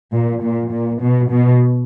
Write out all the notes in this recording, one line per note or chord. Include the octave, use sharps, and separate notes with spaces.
A#2
A#2
A#2
B2
B2